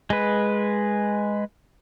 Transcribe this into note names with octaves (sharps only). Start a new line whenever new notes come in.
G#3 B4